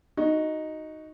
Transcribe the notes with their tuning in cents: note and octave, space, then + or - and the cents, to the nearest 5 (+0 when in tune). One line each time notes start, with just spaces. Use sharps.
D#4 +0 F#4 +0